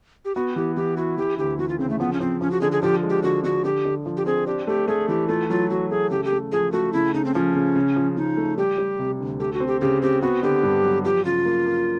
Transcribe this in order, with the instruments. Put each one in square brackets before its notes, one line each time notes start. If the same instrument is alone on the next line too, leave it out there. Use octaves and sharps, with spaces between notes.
[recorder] G4
[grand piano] B3 [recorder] F#4
[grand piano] E3 [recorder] G4
[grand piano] E3 [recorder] G4
[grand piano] E4 [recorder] F#4
[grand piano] E3 [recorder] G4
[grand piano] D2 [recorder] G4
[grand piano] E3 [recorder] F#4
[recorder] F4
[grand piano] C#3 [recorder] C4
[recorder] A3
[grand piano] F3 [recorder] B3
[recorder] C#4
[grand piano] F3 [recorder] C4
[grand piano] F3 [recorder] C#4
[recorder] F#4
[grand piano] D3 [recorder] G#4
[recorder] G#4
[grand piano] F3 [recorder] G4
[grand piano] G#3
[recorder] G4
[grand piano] D3 [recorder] F#4
[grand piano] D3 [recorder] F#4
[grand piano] D3 [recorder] G4
[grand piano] D3
F3
[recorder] G4
[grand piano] C4 [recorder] G#4
[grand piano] D4 [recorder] G4
[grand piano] A3 [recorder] G4
[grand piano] A3 [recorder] G#4
[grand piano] E3 [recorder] G4
[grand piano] A3 [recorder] F4
[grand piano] F#3 [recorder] F4
[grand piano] F#3 [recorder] F#4
[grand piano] A3 [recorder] G#4
[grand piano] C#3 [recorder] G4
[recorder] G4
[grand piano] A3
[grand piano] F3 [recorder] G#4
[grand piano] A3 [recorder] F#4
[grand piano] C#3 [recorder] E4
[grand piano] C#3 [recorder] D#4
[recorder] C4
[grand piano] F3 [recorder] C#4
[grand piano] C#3
C#3
F3
[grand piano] C#3 [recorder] D#4
[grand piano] A3
[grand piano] G3 [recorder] G4
[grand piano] G3
C3
D2
[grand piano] A3 [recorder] G4
[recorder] F#4
[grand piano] C4
[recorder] G4
[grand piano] C#3 [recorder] G4
[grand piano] C4 [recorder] G4
[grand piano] B3 [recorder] F#4
[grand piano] D3 [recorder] G4
[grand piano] G2
F#3
[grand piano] F3 [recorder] G4
[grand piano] C#3 [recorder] F4
[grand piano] A#3
A#3